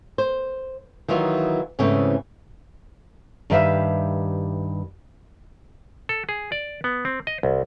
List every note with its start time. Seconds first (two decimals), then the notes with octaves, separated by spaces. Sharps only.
0.18 C5
1.08 D#3 E3 F#3 D#4 F4
1.79 G#2 C#3 E3 A3 C4 C#4
3.50 G2 D#3 G4 B4 E5 F5
6.09 A4
6.29 G#4
6.52 D5
6.84 B3
7.05 C4
7.27 D#5
7.43 C2